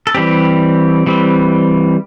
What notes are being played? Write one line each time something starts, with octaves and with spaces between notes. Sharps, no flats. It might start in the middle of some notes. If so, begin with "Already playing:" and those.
A4
E3 G3 C4 G4
E3 G3 C4